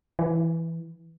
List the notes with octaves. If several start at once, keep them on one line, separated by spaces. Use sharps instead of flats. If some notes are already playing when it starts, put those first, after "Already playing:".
E3